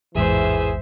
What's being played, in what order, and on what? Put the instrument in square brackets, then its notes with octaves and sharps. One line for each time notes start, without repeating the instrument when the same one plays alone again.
[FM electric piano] A1 E2 G#2 [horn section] E3 G#4 [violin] C5 E5